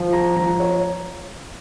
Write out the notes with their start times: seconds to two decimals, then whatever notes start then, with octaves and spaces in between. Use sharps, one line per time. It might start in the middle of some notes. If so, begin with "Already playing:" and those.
Already playing: F3
0.13 A#5
0.36 F3 A#5
0.60 C#5